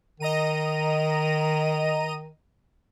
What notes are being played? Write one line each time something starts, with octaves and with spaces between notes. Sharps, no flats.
D#3 D#5 A#5 D#7